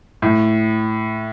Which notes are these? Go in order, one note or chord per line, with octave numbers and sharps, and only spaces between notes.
A2